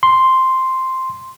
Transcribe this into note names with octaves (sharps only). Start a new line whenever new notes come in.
C6